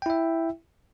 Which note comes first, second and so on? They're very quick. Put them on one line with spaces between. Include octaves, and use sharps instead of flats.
G5 E4 E5